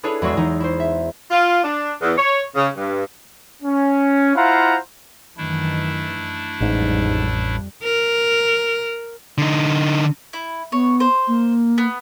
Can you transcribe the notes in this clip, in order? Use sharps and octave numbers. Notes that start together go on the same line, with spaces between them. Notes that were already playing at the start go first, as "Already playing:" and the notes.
D4 E4 G#4 A4 B4 C#5
E2 G#3 F#4 G#4 C#6 E6
E2 E3 D#4 A#5
E4 C5
E5
F4
D4
E2
C#5
C#3
G2
C#4
E4 F4 C5 F5 F#5 A#5
F#2 D#3 E3 A3 D4 E4
A1 F2 G#2 G3
A#4
D3 D#4
E4
B3 C#5
C5
A#3
B3